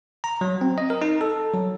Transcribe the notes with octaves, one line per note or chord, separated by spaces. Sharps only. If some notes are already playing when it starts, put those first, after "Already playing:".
A#5
F#3
C4
D#5
A#4
D#4
A4
F#3